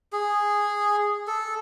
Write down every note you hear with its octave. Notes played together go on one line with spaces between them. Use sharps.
G#4
A4